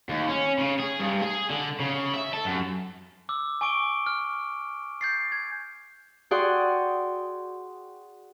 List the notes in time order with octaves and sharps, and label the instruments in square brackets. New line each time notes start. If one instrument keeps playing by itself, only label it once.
[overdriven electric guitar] D#2
C#4
C#3
G#4
G2
G#4
D3
C#3
E5
A4
F#2
[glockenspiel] D6 E6
G#5 C#6 D6 D7 G7
F6
G6 A6 C7
G#6
[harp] F#4 G#4 D5 F#5 G5 C6